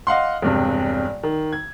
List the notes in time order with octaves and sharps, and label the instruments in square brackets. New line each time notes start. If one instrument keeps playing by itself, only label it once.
[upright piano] D#5 F5 F#5 C6
E1 G2 C3
D#3
G#6